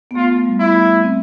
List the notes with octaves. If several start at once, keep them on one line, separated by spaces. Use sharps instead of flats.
B3
A3 F4
G3
E4
A3
C4